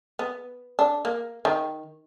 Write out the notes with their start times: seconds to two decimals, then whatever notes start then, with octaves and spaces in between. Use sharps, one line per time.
0.19 B3
0.79 D4
1.05 A#3
1.45 D#3